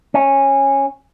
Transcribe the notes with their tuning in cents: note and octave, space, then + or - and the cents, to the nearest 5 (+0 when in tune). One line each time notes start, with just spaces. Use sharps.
C#4 -15